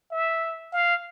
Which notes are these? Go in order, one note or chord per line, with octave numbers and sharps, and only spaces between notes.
E5
F5